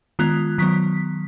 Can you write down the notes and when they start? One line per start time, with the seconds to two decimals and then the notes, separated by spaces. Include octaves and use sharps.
0.19 D#3 G#3 B3 F4 F#6
0.58 D#3 F#3 B3 B6